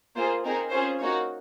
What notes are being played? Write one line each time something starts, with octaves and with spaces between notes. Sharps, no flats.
A#3 F4 G#4 C5
C4 D#4 G#4 A#4
C#4 F4 G#4 C5
A#3 D#4 F#4 C#5